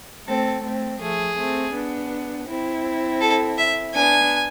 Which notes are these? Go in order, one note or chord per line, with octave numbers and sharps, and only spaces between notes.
A3 C4 A4
A3 C4
F3 A3 G#4
A3 C4
B3 D4
C4 E4
A4
E5
B3 D4 G#5